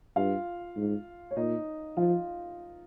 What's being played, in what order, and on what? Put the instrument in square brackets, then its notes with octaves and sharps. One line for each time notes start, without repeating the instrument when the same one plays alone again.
[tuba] G2 [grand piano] F4 F5
[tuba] G#2
[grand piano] C#5
[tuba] A#2 [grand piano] D#4 D#5
[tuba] F3 [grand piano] F4 F5